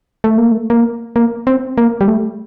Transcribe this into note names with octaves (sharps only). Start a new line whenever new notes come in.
A3
A#3
A3
A#3
A#3
C4
A#3
G3
A3